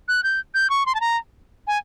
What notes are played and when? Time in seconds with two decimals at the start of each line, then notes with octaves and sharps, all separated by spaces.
0.08 F#6
0.23 G6
0.54 G6
0.70 C#6
0.86 C6
0.95 A5
1.01 A#5
1.67 G#5